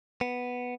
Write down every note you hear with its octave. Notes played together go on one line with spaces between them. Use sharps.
B3